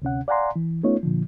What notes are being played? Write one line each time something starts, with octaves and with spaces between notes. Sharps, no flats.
D2 C3 C#4 F#5
D5 F5 F#5 G#5 A#5 C6
E3
A3 B3 C#4 D#4 F4 C#5
A#2 D3 F3